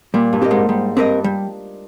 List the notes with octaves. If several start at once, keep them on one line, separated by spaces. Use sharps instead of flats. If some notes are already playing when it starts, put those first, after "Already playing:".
A#2 G3
G2
C4 G4 A#4 D#5
G#2
G#2 G3
G2 C4 G4 A#4 D#5
G3